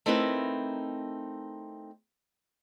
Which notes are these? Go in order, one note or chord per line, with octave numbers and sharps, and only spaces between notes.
A3 C4 D#4 E4 A#4 B4